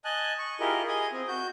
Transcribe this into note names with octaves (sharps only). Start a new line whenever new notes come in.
D#5 G#5 A5 F#6
C#6
E4 F4 G4 G#4 A#4 D#5
G#4 D#5 G#5 D#6
C4
F#4 G6